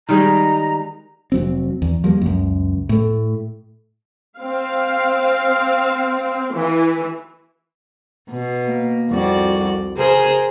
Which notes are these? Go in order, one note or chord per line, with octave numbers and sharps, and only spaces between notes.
D#3 G3 G#3 A#5
F1 F#3 C4
E2
F3 G3 A#3
C#2 F#2
A2 A3
C4 F5
E3
B2
A#3
C2 F2 F#4 D5
C#3 G#4 A#4 C5